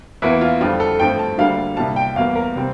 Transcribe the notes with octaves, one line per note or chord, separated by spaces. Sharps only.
E2 E3 A#3 E4
F4
F2 D3 G3 F4
A4
G2 F3 A3 C4 G5
A5
D2 D3 G3 A#3 F5
C2 A#2 G3 A5
G5
E2 E3 G3 A#3 F5
A#4
C3 G3 C4